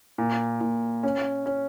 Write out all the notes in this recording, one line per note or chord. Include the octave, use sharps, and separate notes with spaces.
A#2
A#2
C#4
C#4